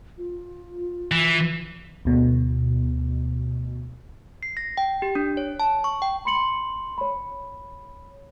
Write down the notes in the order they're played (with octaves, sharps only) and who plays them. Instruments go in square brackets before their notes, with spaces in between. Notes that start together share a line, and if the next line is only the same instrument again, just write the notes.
[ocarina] F4
[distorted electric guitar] E3
[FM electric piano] D2 B2
[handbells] C7
A#6
G5
G4
D4
C#5
A5
C#6
G5
[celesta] B5 C6 C#7 F#7
C#5 B5